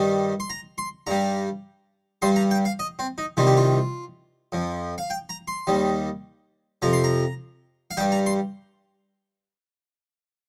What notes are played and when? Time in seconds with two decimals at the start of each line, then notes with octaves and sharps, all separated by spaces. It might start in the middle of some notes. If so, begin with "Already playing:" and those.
Already playing: G2 D#3 G3
0.40 C6
0.50 A#5
0.78 C6
1.07 G2 G3 A#5
2.22 G2 G3 C6
2.36 A#5
2.51 G5
2.65 F5
2.79 D#5
2.99 C4
3.18 D#4
3.37 C2 C3 D#3 G3 F4
3.47 G4
3.57 F4
4.52 F2 F3
4.98 F5
5.10 G5
5.29 A#5
5.48 C6
5.67 D#2 D#3 G3
6.82 F2 C3 F3 A#5
6.93 C6
7.04 A#5
7.91 F5
7.97 G2 G3 G5
8.12 A#5
8.26 C6